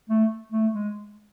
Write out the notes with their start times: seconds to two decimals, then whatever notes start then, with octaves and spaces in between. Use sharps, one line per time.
0.10 A3
0.52 A3
0.73 G#3